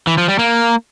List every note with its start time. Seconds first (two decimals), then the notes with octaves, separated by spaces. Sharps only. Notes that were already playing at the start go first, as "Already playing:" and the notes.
0.07 E3
0.18 F3
0.28 G3
0.39 A#3